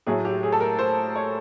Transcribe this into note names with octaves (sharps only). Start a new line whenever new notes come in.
A2 F#3 A3 G#4
G4
G#4
A4
A#4
C5
C#5